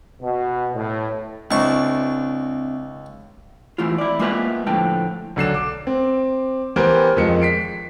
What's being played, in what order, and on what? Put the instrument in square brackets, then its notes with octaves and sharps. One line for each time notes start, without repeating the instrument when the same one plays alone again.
[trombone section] B2
A2
[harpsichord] C#2 C#6 [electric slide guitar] C4 D4 E4
[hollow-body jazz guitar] E3 A3 E4 F4
E4 D5
G#3 A#3 B3 F4 B4 E5
A2 D3 F3 G5 A5
[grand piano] B1 D3 C7 E7
D6
C4
E3 B3 G4 A#4 C5 G5
F2 D#3 F3 G#3 C#7
B6 C7 D7